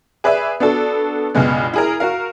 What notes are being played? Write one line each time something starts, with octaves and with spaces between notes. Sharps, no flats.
G#4 B4 D5 E5
B3 D4 F#4 A4
C#2 G2 B2 G#3 B3
E4 G#4 A#4
F#4 A#4 F5